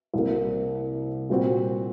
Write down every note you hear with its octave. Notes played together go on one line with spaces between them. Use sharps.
C2 C3 F#3 A#3
A#2 G3 C4 F#4